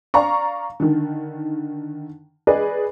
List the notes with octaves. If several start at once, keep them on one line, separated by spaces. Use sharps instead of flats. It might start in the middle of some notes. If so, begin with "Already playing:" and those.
D5 F5 A#5 C#6
D3 D#3
G#4 B4 D5 D#5